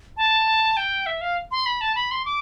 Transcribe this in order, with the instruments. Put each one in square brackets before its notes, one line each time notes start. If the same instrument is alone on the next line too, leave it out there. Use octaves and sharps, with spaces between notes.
[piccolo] A5
G5
E5
F5
C6
B5
A5
B5
C6
D6